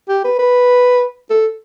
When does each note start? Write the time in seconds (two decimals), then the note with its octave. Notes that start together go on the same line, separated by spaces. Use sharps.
0.09 G4
0.24 B4
0.39 B4
1.30 A4